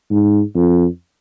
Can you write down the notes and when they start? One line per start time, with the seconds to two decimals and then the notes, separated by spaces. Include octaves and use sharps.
0.11 G#2
0.55 F2